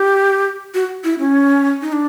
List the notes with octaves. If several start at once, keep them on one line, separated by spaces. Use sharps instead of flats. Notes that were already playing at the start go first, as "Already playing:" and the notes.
Already playing: G4
F#4
E4
C#4
D#4
D4